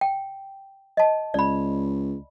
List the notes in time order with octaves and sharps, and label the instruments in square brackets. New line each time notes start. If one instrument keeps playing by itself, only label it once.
[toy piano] G5
D#5 A5
[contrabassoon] C#2 [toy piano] D5 B5